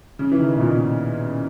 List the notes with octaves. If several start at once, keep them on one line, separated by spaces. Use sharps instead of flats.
C#3
E3
D#3
B2
A#2